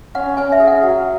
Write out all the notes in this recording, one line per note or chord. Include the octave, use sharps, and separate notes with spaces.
C#4 F#5
C#4 G#5
E5
G#4
F#5
F#3